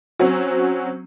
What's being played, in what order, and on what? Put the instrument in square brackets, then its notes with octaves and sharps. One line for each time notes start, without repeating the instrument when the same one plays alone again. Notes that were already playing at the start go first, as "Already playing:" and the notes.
[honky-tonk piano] F#3 C4 C#4 F#4